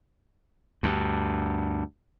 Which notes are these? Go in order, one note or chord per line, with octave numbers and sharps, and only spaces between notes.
D2 G2